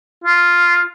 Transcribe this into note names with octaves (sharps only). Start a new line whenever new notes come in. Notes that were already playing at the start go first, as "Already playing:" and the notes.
F4